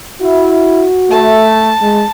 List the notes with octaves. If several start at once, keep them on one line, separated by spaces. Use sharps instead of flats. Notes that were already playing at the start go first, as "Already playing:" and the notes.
E4 F#4
A3 A5
G#3